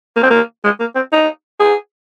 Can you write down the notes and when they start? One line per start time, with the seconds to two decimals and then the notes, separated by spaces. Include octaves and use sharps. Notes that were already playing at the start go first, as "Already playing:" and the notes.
0.16 A#3
0.23 C4
0.30 A#3
0.64 G#3
0.80 A#3
0.95 C4
1.12 D#4
1.60 G#4